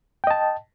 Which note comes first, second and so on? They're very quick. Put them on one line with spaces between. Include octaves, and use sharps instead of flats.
G5 D#5 A5